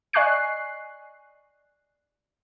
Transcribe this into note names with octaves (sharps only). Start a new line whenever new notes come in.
D5 D#5 G#5 C#6 F#6 C7